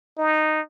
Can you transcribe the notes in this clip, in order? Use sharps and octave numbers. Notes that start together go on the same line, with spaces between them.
D#4